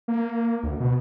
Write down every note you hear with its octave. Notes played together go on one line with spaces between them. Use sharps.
A#3
D2
B2